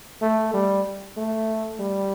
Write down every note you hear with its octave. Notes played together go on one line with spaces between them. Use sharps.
A3
G3
A3
G3